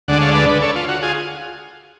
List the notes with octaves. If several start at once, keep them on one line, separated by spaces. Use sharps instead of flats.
D2 D3 G#3 D4 D5 F#5
C#5 F5
B4 D5
B4 D5
A4 C#5
F4
F#4
F4 G#4